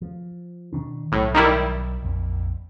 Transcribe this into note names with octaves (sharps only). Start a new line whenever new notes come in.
F3
B2 D#3 D4
B1 A2 F#3
D#3 G3 E4
A#1 F2